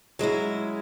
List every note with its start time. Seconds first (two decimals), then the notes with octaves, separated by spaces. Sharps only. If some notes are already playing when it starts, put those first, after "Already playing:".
0.19 F#3 G#3 C#4 E4